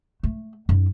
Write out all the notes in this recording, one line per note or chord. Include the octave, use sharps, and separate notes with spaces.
A3
F#2 D#4